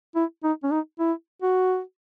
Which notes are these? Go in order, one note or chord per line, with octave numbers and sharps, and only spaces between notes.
E4
D#4
C#4
D#4
E4
F#4